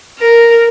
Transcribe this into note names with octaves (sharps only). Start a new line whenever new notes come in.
A#4